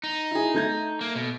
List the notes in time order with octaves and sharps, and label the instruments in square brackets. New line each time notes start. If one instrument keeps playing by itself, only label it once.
[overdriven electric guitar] D#4
[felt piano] E4 G#4
A3 G6 G#6
[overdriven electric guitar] A#3
B2